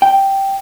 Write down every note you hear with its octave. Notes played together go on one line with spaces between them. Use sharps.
G5